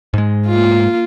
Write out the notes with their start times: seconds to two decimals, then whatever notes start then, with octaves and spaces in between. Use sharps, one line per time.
0.14 G#2 G#3
0.47 A#3 F4